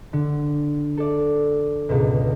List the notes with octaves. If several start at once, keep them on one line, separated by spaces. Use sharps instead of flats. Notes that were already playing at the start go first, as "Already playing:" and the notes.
D3
A4 D5
C#2 G#2 B2